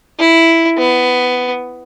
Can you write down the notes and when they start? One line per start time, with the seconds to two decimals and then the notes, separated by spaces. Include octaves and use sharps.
0.19 E4
0.78 B3